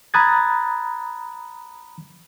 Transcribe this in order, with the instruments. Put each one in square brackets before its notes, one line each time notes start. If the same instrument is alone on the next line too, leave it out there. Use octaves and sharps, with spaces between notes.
[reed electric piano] A#5 B5 D#6 F#6 G#6 A6